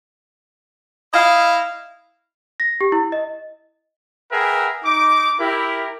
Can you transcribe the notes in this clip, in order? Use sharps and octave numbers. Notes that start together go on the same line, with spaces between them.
E4 D#5 F5
A#6
G4
E4
D#5
G#4 A#4 B4 E5 F#5 G5
D#4 D6
E4 G4 A#4